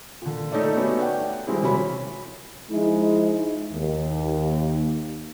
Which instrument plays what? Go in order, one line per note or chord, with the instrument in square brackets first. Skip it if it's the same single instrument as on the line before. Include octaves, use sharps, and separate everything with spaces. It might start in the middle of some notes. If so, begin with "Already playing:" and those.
[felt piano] A#2 D3
A3 D#4 A4 C#5 D5
A3 B3 C#4 D#4 F#4 G4
D5 F#5 G5
D#3 F3 G3 G#3 C4 E4
E1 C3 F#3 C#4 F#4 B5
[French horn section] F3 G#3 D#4 E4
D#2